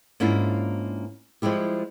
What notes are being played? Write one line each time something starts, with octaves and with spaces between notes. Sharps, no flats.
G#2 A#3 C#4 D4 E4 F4
F3 G3 G#3 E4 G4